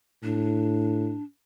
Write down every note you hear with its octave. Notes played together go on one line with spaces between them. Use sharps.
A2 D4